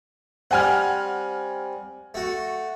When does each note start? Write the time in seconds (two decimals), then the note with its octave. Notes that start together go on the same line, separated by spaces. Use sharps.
0.51 G3 C4 F#5 G#5 F6
2.14 A3 F#4